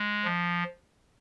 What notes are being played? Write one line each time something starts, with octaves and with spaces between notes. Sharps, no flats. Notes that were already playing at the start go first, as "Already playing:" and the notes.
Already playing: G#3
F3